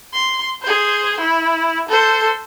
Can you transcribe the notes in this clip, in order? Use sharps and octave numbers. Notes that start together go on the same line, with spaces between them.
C6
G#4 C5
E4
A4 C5